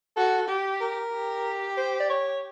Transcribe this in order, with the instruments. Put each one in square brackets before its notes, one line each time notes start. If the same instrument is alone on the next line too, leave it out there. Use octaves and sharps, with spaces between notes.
[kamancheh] F#4 [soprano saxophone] A4
[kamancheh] G4
[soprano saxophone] A#4
[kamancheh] G4
[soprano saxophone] C5
D5
C#5